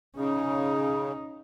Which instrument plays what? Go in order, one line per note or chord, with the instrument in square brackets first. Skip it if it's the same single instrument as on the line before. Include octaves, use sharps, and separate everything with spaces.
[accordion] C#3 [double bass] C#4 D#4